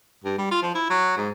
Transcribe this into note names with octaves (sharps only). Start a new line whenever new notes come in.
G2
G3
F4
F3
E4
F#3
G#2